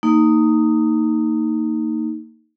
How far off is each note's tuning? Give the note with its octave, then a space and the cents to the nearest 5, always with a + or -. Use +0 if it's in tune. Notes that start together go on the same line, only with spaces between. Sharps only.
A#3 -25 D#4 +0